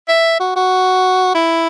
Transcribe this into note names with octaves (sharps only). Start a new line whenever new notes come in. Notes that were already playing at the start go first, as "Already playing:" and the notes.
E5
F#4
F#4
E4